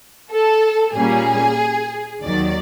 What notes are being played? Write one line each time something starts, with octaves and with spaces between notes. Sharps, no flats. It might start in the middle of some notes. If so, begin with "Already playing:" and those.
A4
A#2 G3 A#3 C#4 G#4
D#2 D#3 F#3 D5